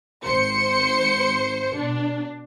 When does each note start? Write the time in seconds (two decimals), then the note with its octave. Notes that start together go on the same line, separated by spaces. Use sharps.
0.23 G#1 C5 C6 C#7
1.77 B2 D4